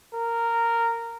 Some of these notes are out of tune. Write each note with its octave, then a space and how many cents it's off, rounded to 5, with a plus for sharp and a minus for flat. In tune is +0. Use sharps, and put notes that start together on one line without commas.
A#4 -10